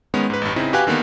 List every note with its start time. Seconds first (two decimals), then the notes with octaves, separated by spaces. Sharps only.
0.14 D#3 G#3 B3 C#4
0.30 G#2 B4
0.42 A1 G2
0.56 C#3 C4 D#4 E4
0.73 F#4 G4 B4 F5 G#5 F#6
0.87 D3 D#3 A#3 B3